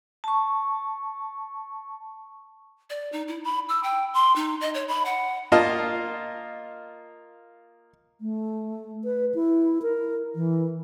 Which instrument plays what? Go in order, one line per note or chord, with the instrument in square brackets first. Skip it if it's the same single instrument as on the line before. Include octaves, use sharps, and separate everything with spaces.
[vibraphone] A5 C#6
[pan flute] D5
D#4
E4
B5
E6
G5
C6
D#4
D#5
C#5
B5
F#5
[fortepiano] A#3 F4 D#5 F5 A5
[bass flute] A3
B4
E4
A#4
E3